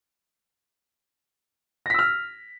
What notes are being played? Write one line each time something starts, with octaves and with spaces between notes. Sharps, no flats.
E6 F6 A#6 B6